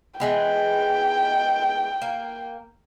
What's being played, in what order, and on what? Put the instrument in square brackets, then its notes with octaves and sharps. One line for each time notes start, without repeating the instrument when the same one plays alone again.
[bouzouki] E3 G#3 B3 [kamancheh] G5
[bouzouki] A#3